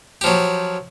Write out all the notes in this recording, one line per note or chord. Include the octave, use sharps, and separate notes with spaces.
F3 F#3 G4